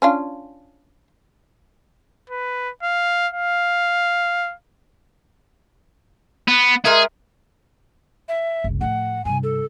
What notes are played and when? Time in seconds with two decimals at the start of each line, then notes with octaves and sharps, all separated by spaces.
0.02 C#4 D4 F4
2.30 B4
2.83 F5
3.33 F5
6.48 B3
6.85 G#3 G#4 A#4 E5
8.29 E5
8.64 F#1 C2
8.81 A2 F3 F#5
9.25 G2 C3 G#5
9.43 A4